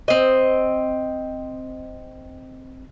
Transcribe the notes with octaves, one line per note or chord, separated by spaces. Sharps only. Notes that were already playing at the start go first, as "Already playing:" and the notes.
C4 D#5